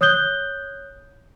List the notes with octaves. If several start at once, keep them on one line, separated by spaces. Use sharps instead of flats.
C#5 D#6 F#6 G6 G7